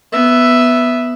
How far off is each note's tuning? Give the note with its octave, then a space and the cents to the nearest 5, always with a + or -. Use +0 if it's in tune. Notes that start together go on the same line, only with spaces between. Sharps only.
B3 +0 E5 +0